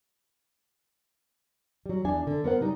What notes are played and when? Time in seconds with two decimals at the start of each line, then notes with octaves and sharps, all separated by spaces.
1.86 F#3 G3
2.05 E2 D4 G#5
2.27 D3
2.44 B3 A#4 C5 F#5
2.60 C#3 G3 D#4